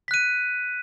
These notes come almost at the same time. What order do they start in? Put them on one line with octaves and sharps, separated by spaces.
B6 F#6 D#7